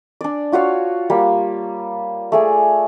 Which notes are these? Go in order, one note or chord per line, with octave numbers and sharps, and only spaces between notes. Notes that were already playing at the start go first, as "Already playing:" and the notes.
D4 D5
F4 F#4 C#5 F5
G3 A#3
A3 G#4 D5